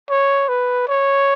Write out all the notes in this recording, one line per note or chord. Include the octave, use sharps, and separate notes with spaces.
C#5
B4
C#5